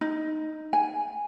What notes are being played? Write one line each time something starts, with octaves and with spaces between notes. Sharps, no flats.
D#4
G#5